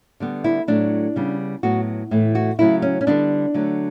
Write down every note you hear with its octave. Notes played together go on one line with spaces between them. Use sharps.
D3 G3 B3
E4
A2 F#3 A3 D4
C#3 G3 B3
A2 F#3 B3 F#4
A2 E3 A3
F#4
C#3 F#3 A3 E4
C#4
C#4
D3 G3 B3 D4
D3 F#3 A3